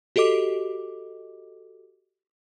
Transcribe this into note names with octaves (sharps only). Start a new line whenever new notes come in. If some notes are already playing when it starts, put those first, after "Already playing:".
F#4 G4 A4 D#5 D6